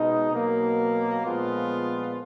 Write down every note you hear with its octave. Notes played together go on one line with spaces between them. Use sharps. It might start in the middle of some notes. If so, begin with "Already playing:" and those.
Already playing: B2 G#3 D#4
B2 F#3 A#3
A#2 F3 G#3 B3 F4